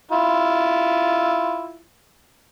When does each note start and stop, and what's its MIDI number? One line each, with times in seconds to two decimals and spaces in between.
0.11 1.81 64
0.11 1.81 65